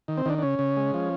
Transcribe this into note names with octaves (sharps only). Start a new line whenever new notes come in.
D#3
C4
D#3 D4
D4
C#3 C#4
C#3
G#3
F3